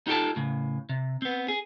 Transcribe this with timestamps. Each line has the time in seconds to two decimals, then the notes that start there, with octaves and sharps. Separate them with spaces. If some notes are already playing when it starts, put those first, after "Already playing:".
0.07 D#4 F4 G4 A4 G5 A5
0.36 A2 C#3
0.89 C3
1.22 B3 C4
1.48 G#4